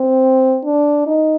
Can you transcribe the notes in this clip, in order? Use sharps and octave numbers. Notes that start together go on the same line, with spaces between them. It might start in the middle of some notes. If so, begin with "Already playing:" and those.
Already playing: C4
D4
D#4